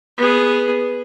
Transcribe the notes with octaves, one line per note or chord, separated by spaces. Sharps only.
B3 G#4